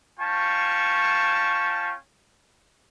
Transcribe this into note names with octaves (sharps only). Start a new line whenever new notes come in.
C#4 F4 G5 A5 C#6